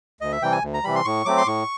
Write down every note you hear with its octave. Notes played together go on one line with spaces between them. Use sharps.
D2 D#5
E5
C3 E3 G3 G5
G#5
D2
A#5
C3 E3 G3 B5
C6
A2 C#6
F#3 A3 C4 D6
C6
A2 C#6